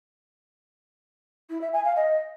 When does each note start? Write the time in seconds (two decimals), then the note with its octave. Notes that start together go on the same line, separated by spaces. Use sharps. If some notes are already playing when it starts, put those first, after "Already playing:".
1.50 E4
1.61 E5
1.73 G#5
1.85 F5
1.96 D#5